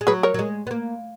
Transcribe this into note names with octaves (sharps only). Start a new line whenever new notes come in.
G#3
F#3 G#4 B4
A#4 C#5
F#3
G#3
B3
A#3